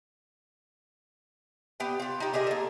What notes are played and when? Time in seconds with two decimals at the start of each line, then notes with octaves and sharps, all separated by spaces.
1.80 B3 G4 G5
2.00 F4 G4
2.20 D#4 G4
2.33 G4 G#4 A#4 D#5
2.47 A#3 A4